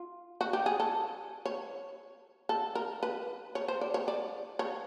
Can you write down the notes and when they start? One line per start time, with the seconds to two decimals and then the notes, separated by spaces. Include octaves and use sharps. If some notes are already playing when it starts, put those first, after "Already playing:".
Already playing: F4
0.41 F#4
0.53 G4
0.66 G#4
0.80 A4
1.46 C#5
2.49 A4
2.75 A#4
3.03 B4
3.55 C#5
3.68 C5
3.81 D5
3.94 C#5
4.08 D5
4.59 C#5